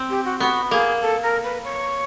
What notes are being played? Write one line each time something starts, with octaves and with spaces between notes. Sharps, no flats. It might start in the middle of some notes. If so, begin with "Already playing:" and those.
Already playing: C4
G4
F#4
B3 F#4
A#3 G#4
A4
A#4
B4
C#5